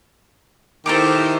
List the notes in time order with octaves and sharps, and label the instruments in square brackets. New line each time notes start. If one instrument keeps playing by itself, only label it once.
[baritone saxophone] D#3 [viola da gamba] E4 G4 C5 [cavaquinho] A4 A#5 D6